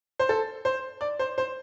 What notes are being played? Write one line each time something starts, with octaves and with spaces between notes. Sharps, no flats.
C5
A4
C5
D5
C5
C5